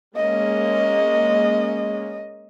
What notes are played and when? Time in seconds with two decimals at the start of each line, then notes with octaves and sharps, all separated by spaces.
0.16 G#3 A#3 C#4 D#5